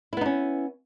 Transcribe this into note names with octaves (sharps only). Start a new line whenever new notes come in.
B3 C#4 D#4 E4